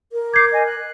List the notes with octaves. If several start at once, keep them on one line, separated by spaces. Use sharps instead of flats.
A#4
D6 G6 G#6 C7
D#5 G#5
F#6